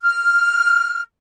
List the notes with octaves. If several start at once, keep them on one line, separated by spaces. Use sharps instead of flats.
F6